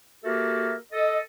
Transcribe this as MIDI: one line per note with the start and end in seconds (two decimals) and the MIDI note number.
0.24 0.75 58
0.24 0.75 66
0.24 0.75 67
0.24 0.75 69
0.24 0.75 70
0.24 0.75 76
0.92 1.17 69
0.92 1.17 75